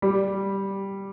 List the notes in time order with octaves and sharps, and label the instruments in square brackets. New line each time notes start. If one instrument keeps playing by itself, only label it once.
[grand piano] G3